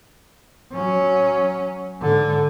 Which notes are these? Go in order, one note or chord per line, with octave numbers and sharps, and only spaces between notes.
F#3 C#4
G#2 D3